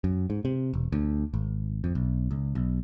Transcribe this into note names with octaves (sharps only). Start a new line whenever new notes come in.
F#2
G#2
C3
E1
D2
G#1
F2
B1
C#2
B1